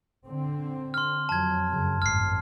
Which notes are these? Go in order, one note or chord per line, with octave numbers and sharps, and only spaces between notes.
D3 C4
C6 F6
F2 F#3 A5 G#6
F#2 C#3
G#1 F#2 A2 F6 C7